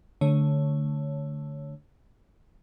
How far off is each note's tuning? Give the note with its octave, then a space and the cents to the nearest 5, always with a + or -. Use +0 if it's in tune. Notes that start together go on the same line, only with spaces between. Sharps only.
D3 +0 A3 +0 C#5 +0